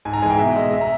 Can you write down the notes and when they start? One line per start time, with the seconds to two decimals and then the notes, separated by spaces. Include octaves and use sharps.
0.05 G#2 G#5
0.13 A#5
0.22 E3 G#3 G#5
0.30 G5
0.39 B2 E5
0.56 G#3 D#5
0.73 E5
0.81 A#5